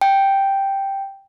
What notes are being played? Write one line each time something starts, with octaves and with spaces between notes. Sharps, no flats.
G5